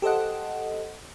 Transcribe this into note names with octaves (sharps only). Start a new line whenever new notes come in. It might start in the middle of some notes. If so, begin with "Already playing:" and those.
G4 A4 C5 D#5 F#5